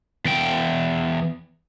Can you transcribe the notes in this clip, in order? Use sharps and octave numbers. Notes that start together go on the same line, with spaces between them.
E2 G5